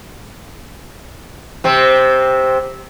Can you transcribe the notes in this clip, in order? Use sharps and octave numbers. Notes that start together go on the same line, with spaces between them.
C3 C4